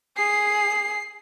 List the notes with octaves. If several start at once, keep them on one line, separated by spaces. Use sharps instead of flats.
G#4 C7